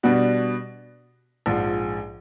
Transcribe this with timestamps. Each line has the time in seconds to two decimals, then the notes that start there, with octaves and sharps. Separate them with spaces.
0.03 B2 G3 B3 D4 F#4
1.46 A#1 G#2 F3